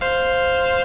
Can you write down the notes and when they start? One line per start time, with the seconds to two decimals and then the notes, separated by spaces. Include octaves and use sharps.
0.01 C5 F5